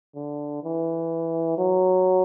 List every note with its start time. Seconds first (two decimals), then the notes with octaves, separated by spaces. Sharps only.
0.15 D3
0.63 E3
1.58 F#3